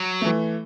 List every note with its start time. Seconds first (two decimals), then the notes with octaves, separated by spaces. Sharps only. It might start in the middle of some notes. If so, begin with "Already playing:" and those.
Already playing: F#3
0.21 E3 A3